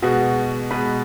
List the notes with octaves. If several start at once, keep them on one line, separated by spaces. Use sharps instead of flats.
B2 G#3 F#4
B2 G#3 B4